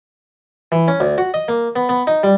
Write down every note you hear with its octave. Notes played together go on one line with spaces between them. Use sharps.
E3
C#4
D2
F#4
D#5
A#3
B3
B3
D#4
G3